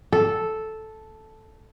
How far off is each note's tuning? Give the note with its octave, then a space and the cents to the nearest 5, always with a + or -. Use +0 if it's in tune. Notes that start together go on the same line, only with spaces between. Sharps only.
A4 -5